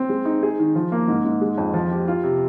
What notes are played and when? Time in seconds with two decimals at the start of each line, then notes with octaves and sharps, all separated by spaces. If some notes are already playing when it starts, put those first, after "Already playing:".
Already playing: C4
0.09 G#3
0.25 D#4
0.43 G#4
0.59 D#3
0.75 F3
0.92 A#3
1.08 G#2
1.25 G#2
1.41 G#3
1.58 F2
1.74 F3
1.91 G4
2.08 F4
2.24 C3